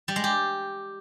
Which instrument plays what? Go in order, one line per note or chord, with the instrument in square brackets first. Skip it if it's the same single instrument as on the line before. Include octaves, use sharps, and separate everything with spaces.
[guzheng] G3
G#3
G4